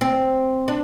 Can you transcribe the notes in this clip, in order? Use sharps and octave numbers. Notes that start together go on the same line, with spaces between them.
C4
D4